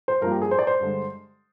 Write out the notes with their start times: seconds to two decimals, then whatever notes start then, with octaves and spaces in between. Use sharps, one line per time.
0.08 C5
0.21 G2 F3 A#3 A#4
0.32 G4
0.42 G#4
0.51 C5
0.59 D5
0.67 C5
0.80 G2 D3 G#3